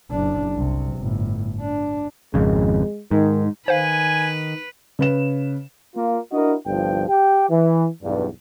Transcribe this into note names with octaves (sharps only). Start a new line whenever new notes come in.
F#1 D4
C2 C3
G1 A2
D4
G#1 F2 C#3 G#3
G#2 D#3
D#3 B4 C5 F5 G#5
C#3 B4 E7
A#3 F4
D4 E4 F#4 A#4 D#5
G1 C2 G2 F3 G5
G4 G5
E3
B1 E2 G2